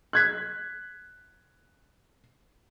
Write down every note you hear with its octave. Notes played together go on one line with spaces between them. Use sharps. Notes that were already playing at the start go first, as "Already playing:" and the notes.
F#6 G#6 B6